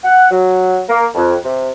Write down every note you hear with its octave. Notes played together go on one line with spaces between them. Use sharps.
F#5
F#3
A#3
F2
C3